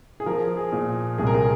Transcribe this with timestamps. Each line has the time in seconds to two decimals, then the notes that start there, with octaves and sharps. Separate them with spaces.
0.20 G#4
0.26 F3 A#4
0.57 G#4
0.72 A#2
1.18 C2 G#4
1.27 A#4
1.34 G#4